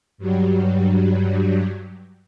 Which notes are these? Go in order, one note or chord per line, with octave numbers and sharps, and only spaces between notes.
G2 F#3 G3